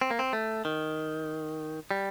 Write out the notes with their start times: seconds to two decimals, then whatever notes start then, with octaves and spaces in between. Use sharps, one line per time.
0.01 C4
0.11 A#3
0.19 C4
0.33 A3
0.65 D#3
1.91 G3